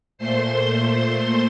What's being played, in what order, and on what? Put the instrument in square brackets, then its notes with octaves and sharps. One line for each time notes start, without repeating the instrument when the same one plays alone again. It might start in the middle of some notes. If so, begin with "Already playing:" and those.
[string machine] A#2 A3 C5 C6